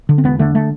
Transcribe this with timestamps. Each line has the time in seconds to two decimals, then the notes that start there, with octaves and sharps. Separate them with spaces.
0.09 D3
0.18 C4
0.24 E1 B3
0.39 D3 A3
0.55 A3